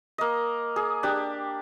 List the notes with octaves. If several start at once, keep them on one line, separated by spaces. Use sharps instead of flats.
A#3 D#5
G#4
D4 G4